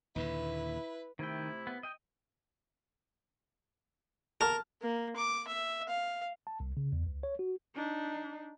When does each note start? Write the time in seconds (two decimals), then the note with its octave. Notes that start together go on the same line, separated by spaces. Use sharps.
0.16 D#2 A#2 D3 E4 B4
1.19 C3 D#3 A3 E4 G5
1.67 B3
1.83 D#5 G5
4.41 A#4 A5 F6
4.82 A#3
5.16 D6
5.48 E5
5.89 F5
6.47 A5
6.60 C2
6.77 C#3
6.92 E2
7.06 C#2
7.23 C#5
7.39 F#4
7.75 D4 D#4